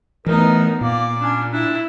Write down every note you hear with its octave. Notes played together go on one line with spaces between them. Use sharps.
E3 A3 B3 D#4 A#4
A#2 A#3 D5
C#4 D4
D4 E4